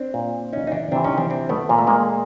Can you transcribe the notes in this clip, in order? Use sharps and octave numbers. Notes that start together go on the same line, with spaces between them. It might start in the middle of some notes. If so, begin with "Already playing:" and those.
Already playing: C4 D4
A#2
C#4 D#4
D#4
D4 E4
C3 E3 C4 D4
C#4 D#4
C4 D4
C4 D4
A3 B3
A#2 A#3
A3
G#3 A#3